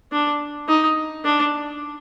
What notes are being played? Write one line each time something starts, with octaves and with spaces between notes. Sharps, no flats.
D4
D#4
D4